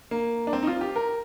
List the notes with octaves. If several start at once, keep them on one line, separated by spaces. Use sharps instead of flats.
A#3
D4
C4
D#4
F4
G4
A#4